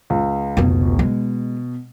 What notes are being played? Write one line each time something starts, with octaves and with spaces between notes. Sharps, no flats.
C#2
F1 C#2 B2
G#3